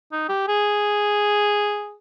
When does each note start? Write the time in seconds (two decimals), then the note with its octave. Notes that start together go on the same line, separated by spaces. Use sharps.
0.12 D#4
0.29 G4
0.48 G#4